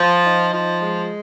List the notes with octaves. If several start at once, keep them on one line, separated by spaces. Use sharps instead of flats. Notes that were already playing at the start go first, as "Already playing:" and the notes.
Already playing: F3
D#4
F3
G#3